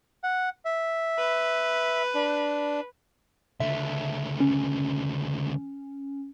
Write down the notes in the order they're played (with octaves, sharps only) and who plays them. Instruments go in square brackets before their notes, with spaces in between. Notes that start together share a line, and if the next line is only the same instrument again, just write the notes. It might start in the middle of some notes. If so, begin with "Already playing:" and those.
[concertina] F#5
E5
[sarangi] B4
[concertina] D4
[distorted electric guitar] C#2 D3 [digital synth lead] E5
[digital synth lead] C#4